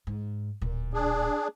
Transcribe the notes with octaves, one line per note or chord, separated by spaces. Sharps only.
G#2
D1 A#2
D4 G#4